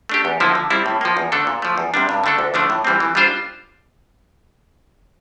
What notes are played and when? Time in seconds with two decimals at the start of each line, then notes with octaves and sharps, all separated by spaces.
0.09 A3 D4 G4
0.25 E2
0.40 D3 F3 A#3 E4
0.55 D3
0.70 G3 C4 E4
0.86 A2
1.01 F3 A#3
1.17 E2
1.32 D3 A3 D4 A4
1.47 A#2
1.62 F3 A3
1.78 E2
1.94 C3 G3 D4
2.09 G2
2.24 D3 A3 D4 A4
2.39 D2
2.54 D3 F3 A3 D4
2.70 A2
2.84 E3 G3 C4
3.00 E3
3.15 G3 D4 F4 C5